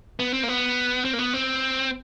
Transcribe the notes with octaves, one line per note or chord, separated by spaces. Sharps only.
B3
C4
A#3
B3
C4
A#3
B3
C4